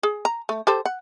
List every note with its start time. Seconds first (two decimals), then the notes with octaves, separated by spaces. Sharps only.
0.03 G#4
0.25 A#5
0.49 A3
0.67 G4 A4 C5
0.85 F#5